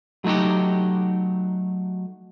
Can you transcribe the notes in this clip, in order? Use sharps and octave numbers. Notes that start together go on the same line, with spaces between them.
F#3 A3 D#4 F#4 G4